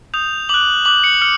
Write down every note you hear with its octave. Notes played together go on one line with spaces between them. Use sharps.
D#6 G6 F7
D6 F#6 F#7
D6 F#6 F#7
C#7
F6 C#7